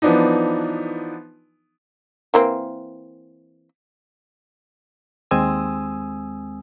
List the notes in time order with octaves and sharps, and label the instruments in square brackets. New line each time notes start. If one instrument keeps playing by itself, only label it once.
[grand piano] E3 F3 B3 D4 D#4
[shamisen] E3 A#3 C4
[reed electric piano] D#2 G#3 C4 G#5 D#6 E6